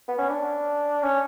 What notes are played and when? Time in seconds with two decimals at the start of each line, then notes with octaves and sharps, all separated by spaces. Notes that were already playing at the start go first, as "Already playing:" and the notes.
0.08 B3
0.18 C#4
0.29 D4
1.03 C#4